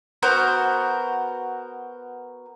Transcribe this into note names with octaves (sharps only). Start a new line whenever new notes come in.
B3 F#4 A#4 C5